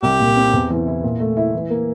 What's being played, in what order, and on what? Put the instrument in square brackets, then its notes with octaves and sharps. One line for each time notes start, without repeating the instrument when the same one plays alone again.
[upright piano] C2 [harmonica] G4
[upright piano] A#2
C4
E2
E3
E4
A#2
A3
E4
E3
A#3